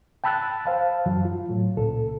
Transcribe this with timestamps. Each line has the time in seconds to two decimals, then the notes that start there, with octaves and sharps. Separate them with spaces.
0.24 G5 A5 B5 E6 F#6 A6
0.66 C5 F5 A5
1.06 F#2 E3 F#3
1.25 F4
1.49 A2 F#3
1.77 C#2 A#2 A4